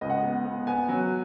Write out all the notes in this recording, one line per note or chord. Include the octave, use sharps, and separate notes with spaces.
C#2 D#5
F#5
B3 D#5
B3
B3 G#5
F#3